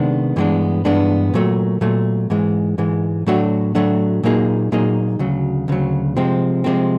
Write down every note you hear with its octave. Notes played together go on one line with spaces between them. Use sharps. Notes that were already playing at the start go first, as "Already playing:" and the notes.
Already playing: C3 D#3 G#3 B3 D4
G2 E3 G#3 B3 D4
G2 E3 G#3 B3 D4
A#2 F#3 A3
A#2 F#3 A3
G#2 E3 G#3
G#2 E3 G#3
A2 F#3 A3 D4 F#4
A2 F#3 A3 D4 F#4
A#2 F#3 A#3 D#4 G#4
A#2 F#3 A#3 D#4 G#4
D2 C#3 F#3
D2 C#3 F#3
C3 F3 G#3 C4
C3 F3 G#3 C4